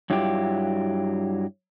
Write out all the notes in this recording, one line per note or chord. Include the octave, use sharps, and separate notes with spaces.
G2 F#3 E4 F4 G4